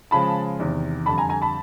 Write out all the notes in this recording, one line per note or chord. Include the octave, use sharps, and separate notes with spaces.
C#3 F3 G#3 A5 B5
E2 C3 D#3
F2 D3 G3 A5 B5
G#5 A#5
G#5 A#5
A5 B5